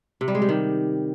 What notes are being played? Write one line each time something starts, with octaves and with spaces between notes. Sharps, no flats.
C3
G3
G#3
G3
D#3